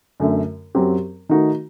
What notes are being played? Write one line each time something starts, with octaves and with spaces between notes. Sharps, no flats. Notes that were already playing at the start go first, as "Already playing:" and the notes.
F#2 D3 A3
F#2 F#3 C4 G4
D#3 A3 D#4 F#4